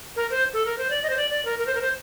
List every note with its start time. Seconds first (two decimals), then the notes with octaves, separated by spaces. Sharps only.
0.16 A#4
0.31 C5
0.54 A4
0.66 A#4
0.78 C5
0.90 D5
1.03 D#5
1.10 C5
1.17 D5
1.30 D5
1.45 A#4
1.59 A#4
1.66 C5
1.75 A#4
1.81 C5